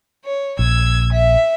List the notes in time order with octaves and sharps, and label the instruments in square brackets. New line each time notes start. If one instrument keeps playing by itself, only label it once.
[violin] C#5
[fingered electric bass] A#1 [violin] E6 G#6
[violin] E5